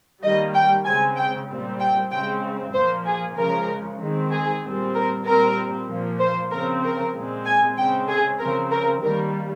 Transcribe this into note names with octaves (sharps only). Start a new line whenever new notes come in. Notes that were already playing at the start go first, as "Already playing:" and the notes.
D#3 G3 A#3 D#5
G5
C#3 G#3 C4 G#5
G5
A#2 G3 C4
G5
C#3 G#3 C4 G5
A#2 F3 A#3 C5
G#4
C#3 F3 G#3 A#4
D#3 G#3 C4
G#4
A#2 G3 C4
A#4
A#2 G3 C4 A#4
A#2 F3 A#3
C5
C#3 F3 C4 A#4
A#4
A#2 G#3 C4
G#5
C#3 G#3 C4 G5
G#4
C#3 F3 C4 A#4
A#4
D#3 G3 A#3 A#4